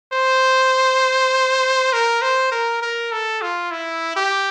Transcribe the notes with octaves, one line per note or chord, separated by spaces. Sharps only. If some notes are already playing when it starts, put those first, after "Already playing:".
C5
A#4
C5
A#4
A#4
A4
F4
E4
G4